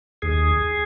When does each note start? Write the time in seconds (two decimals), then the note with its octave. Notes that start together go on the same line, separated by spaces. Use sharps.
0.22 D#2 G#4